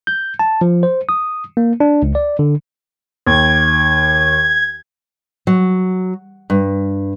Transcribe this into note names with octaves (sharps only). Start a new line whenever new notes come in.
G6
A5
F3
C5
D#6
A#3
D4
C#2
D5
D3
D#2 G#6
F#3
G2